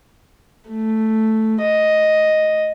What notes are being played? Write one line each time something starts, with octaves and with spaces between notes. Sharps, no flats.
A3
D#5